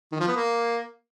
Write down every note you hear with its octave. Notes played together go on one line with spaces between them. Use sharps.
D#3
F3
B3
A#3